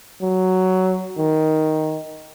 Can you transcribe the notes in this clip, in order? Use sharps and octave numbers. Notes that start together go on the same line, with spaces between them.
F#3
D#3